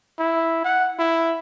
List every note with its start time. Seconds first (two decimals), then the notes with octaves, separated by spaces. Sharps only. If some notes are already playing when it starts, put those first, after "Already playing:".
0.19 E4
0.64 F#5
0.99 E4